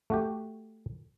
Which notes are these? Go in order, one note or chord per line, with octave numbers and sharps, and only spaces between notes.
A3 F#4 G4